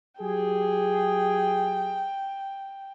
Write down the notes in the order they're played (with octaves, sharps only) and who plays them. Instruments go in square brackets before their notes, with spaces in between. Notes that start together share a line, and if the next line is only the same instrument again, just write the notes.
[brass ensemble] F#3 G4 G#4 [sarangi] G5